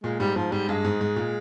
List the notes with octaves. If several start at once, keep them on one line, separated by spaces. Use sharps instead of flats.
A#2 G#3
G#2 G3
G#2 F3
G#2 G3
G2 G#3
G#2
G#2
A#2